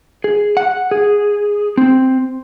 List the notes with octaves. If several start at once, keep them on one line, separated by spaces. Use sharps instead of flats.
G#4
F#5
G#4
C4